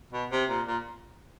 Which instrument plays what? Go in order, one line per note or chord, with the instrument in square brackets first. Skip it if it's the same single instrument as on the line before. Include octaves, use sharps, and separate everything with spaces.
[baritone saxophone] B2
C3
A#2
A#2